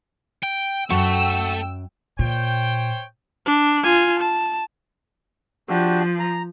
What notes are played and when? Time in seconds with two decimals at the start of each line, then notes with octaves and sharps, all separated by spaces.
0.43 G5
0.90 F#2 A3 F#4 G5 E6
2.19 A#2 C5 C#5 G5
3.46 D4
3.83 F4 G#5
4.19 A5
5.69 F3 D4 F#4 G4
6.19 A#5